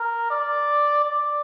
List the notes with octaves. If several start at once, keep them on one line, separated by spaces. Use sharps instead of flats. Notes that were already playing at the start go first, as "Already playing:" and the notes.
Already playing: A#4
D5
D5